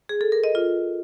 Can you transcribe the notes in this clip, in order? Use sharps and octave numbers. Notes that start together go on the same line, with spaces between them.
G#4
A4
A#4
D#5
F4